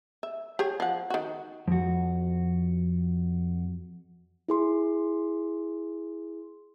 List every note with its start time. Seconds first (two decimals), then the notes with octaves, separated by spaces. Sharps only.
0.23 E5
0.59 G4 G#4 C#5
0.80 F3 F#5
1.10 D#3 F#4
1.68 F2 F#4
4.48 E4 G#4 C6